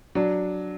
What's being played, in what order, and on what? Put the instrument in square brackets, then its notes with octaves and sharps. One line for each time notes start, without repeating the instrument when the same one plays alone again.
[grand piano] F#3 [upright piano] D4